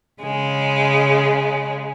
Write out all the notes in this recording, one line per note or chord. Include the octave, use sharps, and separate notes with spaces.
C#3 G#3